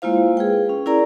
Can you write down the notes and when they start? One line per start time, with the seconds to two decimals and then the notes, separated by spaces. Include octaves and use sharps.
0.02 G#3 A#3 E4 F4 C5 F5
0.37 G#4 B4 G5
0.69 C#4
0.86 C#4 E4 G#4 A#4 D5 A#5